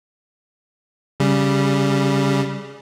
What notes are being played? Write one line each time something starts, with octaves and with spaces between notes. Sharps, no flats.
C#3 G3